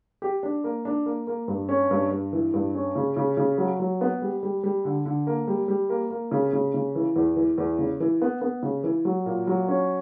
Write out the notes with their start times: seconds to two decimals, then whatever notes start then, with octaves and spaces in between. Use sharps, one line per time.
0.22 G4
0.43 D4
0.64 A#3
0.85 D4
1.06 A#3
1.27 A#3
1.48 G2
1.69 C#4
1.91 G2
2.11 G2
2.33 E3
2.54 G2
2.75 C#4
2.95 C#3
3.17 C#3
3.37 C#3
3.58 F#3
3.80 F#3
4.01 B3
4.22 G3
4.43 G3
4.64 G3
4.85 D3
5.06 D3
5.27 A#3
5.47 G3
5.68 G3
5.90 A#3
6.10 A#3
6.32 C#3
6.53 C#3
6.74 C#3
6.95 E3
7.16 E2
7.36 E3
7.58 E2
7.79 C#3
8.00 E3
8.22 B3
8.41 B3
8.63 C#3
8.84 E3
9.05 F#3
9.26 A#2
9.47 F#3
9.69 C#4